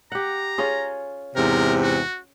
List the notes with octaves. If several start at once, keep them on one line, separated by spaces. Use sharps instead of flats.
G4 F#5 A#5
C#4 F4 G#4
E2 G#2 C3 A#4
F#4